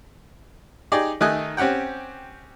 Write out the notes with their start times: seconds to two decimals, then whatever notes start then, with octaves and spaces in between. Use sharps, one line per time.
0.92 D#4 G4 G#4 D5
1.21 D#3 A3 D#4 G#5 D#6 F#6
1.57 C4 C#4 G4 F#5 G5